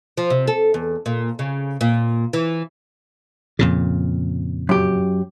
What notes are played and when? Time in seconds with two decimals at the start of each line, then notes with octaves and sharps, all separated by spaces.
0.17 F3
0.30 C3
0.47 A4
0.74 E2
1.06 A#2
1.39 C#3
1.81 A#2
2.33 E3
3.59 F2 A#2 C#3
4.69 F#2 G4